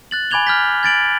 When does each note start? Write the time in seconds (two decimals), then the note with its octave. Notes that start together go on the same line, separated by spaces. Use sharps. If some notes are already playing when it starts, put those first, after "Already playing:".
0.11 F#6 A6 F#7
0.31 G#5 B5 D6 G#6 F7 G7
0.47 F6 G6 B6
0.83 G#6 A6 D7 F#7